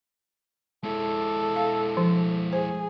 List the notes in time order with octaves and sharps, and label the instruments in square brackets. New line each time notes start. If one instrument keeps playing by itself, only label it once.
[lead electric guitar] G#3 E4 [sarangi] A4
[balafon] F5
F3
[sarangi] G#4 [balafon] C5